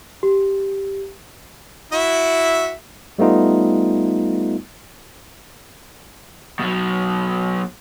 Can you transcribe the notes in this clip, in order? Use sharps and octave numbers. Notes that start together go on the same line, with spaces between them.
G4
E4 F#4 E5
G3 A3 B3 D#4 F4
B2 F#3